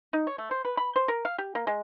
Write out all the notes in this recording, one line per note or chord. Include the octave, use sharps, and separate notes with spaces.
D#4
C#5
A3
C5
B4
B5
C5
A#4
F5
G4
A#3
G#3